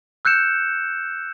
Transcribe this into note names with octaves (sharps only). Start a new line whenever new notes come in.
E6 F#6 G6 C#7 E7